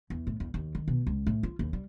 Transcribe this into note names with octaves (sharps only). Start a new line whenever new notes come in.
E2
A2
E2
D#2
D#3
B2
C#2
A2
F4
D#2
G3